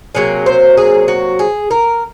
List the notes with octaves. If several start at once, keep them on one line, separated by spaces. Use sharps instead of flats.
C3 F#3 A#3 G#4
C5
G#4
F#4
G#4
A#4